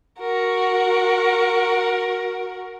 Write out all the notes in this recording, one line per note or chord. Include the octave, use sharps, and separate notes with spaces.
F#4 A#4